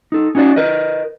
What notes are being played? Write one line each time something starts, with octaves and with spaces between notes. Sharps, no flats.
D#4 A4
C#4 D#4 F#4 C5 D5
A#4 B4 D#5